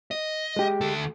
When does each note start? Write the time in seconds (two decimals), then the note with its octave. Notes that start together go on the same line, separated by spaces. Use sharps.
0.11 D#5
0.56 G#3 G4
0.81 D2 A4